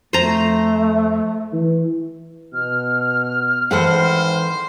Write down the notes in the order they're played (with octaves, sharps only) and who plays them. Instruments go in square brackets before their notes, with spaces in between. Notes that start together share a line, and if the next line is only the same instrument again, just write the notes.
[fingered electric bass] F2 [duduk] A3 [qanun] C5 A#5
[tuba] E3
[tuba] B2 [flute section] F6
[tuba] G#1 [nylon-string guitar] E3 A4 F#5 [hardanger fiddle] C5